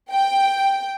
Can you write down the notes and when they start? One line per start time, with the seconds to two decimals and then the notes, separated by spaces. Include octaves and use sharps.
0.11 G5